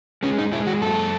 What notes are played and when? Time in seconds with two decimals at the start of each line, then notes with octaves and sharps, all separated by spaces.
0.23 G#3 C#4
0.38 D#4
0.52 G#3 E4
0.67 F#4
0.82 F#2 A4